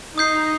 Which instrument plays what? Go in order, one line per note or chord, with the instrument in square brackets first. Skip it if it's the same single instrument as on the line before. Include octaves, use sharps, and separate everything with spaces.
[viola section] D#4 [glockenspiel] D#6 G6 C7